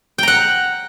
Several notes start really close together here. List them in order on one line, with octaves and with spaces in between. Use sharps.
G5 A#5 F#5